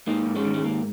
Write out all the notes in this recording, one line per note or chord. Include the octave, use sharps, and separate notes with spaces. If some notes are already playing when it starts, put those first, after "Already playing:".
G#2 A#3 D#4
G#2
G#3 C#4
D#3
G#3
G#2 A#3